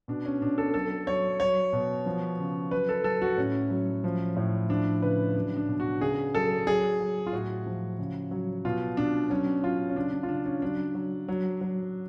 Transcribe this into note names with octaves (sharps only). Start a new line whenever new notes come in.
B2 D4
C#4
B2 D4
A4
F#3 A4
F#3 C#5
F#3 C#5
B2
F3
C#3
F#3 B4
A4
F#3 A4
F#4
A2 C#4
F#3
F3
A2
F3 D4
C#3 B4
F#3 D4
D4
B2
F#4
C#3 G#4
F#3 A4
F#3 G#4
F#3
F4
A2 F#4
F3
C#3
F#3
B2 F4
B2 D4
F#3 C#4
F#3 F4
C#4
C#3 D4
D4
F4
C#3 D4
C#4
F#3 D4
F#3
F#3
F#3